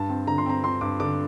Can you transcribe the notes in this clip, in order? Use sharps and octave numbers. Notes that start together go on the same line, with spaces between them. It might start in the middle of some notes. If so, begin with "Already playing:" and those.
Already playing: G2 A5
C4
D3 A#5
C6
C4 A#5
C4 C6
G2 D6
D3 D6